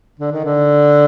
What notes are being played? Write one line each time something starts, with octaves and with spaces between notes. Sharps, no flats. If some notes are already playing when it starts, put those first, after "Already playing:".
D3
D#3
D3